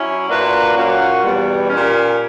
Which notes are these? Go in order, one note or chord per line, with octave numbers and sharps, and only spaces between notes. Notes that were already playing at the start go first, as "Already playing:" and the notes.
Already playing: F#3 C#4 E4
A#2 A#3 D4 F#4 B4
A#2 F#3 A#3 C#4 F#4
E2 B2 G3
A#2 G3 C#4